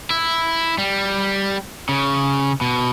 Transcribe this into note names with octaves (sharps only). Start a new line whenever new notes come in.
E4
G3
C#3
B2